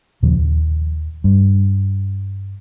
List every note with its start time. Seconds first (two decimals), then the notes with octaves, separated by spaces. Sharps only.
0.23 D#2 A#2 C#3 F3
0.38 D#2
1.24 G2